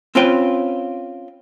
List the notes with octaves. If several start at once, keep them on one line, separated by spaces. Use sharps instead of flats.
C4 C#4 F4 B4 G5